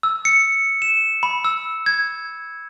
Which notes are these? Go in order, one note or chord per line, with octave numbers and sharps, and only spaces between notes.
E6
C#7
E7
B5
E6
G#6